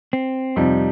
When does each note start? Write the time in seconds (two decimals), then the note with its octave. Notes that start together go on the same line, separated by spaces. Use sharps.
0.13 C4
0.56 F2 C3 F3 G3 D#4